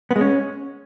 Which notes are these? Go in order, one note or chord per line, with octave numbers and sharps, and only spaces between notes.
B3
G#3
C#4